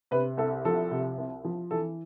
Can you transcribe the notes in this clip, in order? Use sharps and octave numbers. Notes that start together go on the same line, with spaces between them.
C3 B4
C2 A4
F3 A4
C3
C2
F3
E3 A4